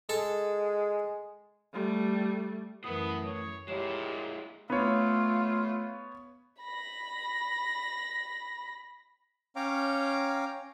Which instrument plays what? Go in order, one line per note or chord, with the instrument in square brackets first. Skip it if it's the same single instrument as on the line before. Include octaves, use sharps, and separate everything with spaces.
[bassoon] G#3 [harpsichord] A4
[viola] G3 A3
[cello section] F#2 E3 F#3 [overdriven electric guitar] A2 [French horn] B3 [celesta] A#4 B4 D#6
[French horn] C#5
[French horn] A#2 [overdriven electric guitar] G#3 E4 [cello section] G4 [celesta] C#5 E7
[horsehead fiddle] A3 F4 [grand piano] B3 C#5
[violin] B5 A#6
[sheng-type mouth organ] C#4 C#5 F5 G5 A#5 D6